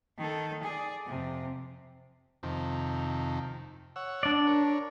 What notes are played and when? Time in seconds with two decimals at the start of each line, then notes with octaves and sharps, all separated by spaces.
0.18 D#3 A4
0.63 G#4 D5
1.07 F2 C3
2.43 F2 C3 D#3
3.96 C#5 F#5 E6
4.23 D4 D5
4.47 A#4 C#5